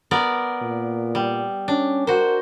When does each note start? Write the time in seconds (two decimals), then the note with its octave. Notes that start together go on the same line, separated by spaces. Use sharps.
0.11 B3 A#4 D5
0.62 A#2
1.15 G3
1.68 C#4 D4
2.07 F#4 A#4 C5